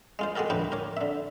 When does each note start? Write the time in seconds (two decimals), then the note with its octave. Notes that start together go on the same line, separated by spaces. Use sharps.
0.19 G#3 F4 C5
0.36 G#3 F#4 G4 A4 A#4
0.50 D2 A2 F3 A3 B4 G5
0.72 A#4 C#5 D6
0.97 D3 E5